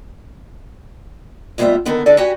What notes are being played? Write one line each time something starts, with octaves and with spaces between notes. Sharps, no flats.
D2 G#2 G3 B3 F4 E5
D3 D#3 B3 D#4 A4 A#4
D3 E3 G#3 A4 D5
F#4 G4 B4 G#5